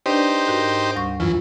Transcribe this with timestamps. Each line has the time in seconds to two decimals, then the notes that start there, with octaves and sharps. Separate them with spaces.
0.06 D4 D#4 G4 B4 C5 D5
0.47 G#2 F#4 A#4
0.96 D2 G3 C#6
1.20 F#2 E3 F4